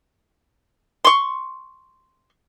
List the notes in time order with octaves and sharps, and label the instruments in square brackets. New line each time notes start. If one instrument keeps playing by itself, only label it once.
[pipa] C6 C#6